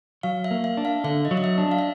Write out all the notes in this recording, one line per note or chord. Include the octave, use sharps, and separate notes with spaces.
F#3 F5
E5
A#3
E5
D4
F5
D3 E5
D#5
F#3
D#5
E5
D4
F5
E5